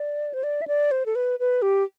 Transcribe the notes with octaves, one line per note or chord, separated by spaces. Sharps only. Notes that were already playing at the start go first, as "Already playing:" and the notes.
Already playing: D5
C5
D5
E5
D5
C5
A4
B4
B4
G4